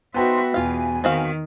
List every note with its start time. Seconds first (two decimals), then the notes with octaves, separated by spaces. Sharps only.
0.14 B3 D#4 F#4 C5 E5 G5 C6
0.54 E2 B2 F4 F5 G#5
1.04 D#3 C4 F#4 F5